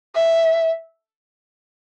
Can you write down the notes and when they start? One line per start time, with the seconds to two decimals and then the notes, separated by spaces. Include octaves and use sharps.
0.15 E5